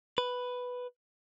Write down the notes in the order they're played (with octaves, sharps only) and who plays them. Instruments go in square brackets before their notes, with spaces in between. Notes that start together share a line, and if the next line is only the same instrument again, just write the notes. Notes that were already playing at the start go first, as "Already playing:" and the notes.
[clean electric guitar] B4